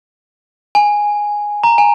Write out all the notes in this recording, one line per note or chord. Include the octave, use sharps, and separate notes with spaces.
G#5
A#5
G#5